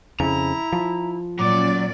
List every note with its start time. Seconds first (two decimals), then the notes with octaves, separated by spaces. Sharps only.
0.20 F2 C#3 E4 A#5
0.73 F3
1.39 A#2 F#3 C#4 D5 D6